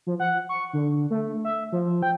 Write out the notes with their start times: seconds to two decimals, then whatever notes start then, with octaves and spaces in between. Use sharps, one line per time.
0.07 F3
0.20 F#5
0.49 C#6
0.73 D3
1.11 A3
1.45 E5
1.72 F3
2.03 G5